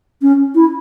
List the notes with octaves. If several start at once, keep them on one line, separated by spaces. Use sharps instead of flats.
C#4
E4